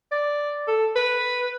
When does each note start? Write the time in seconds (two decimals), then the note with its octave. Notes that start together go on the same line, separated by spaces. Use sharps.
0.11 D5
0.68 A4
0.96 B4